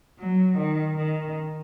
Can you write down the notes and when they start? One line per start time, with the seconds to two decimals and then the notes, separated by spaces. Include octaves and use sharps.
0.19 F#3
0.58 D#3
0.98 D#3